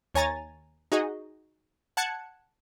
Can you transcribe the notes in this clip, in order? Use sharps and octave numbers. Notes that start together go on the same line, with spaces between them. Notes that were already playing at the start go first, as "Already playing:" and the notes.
D#2 C#5 G#5 A#5 A6
D#4 F#4 G#4 D#5
F#5 A5 F#6 G#6 C#7